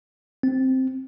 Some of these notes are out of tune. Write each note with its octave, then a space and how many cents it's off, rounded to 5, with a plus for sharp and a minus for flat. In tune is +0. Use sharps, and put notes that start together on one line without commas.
C4 +0